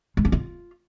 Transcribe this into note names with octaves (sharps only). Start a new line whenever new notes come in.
G#3
C#4
F4